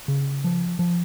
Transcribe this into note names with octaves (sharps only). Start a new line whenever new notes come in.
C#3
F3
F3